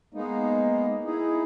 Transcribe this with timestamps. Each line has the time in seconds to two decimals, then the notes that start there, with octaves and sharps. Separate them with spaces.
0.14 G#3 A#3 B3 D#4
1.05 D#4 E4 G#4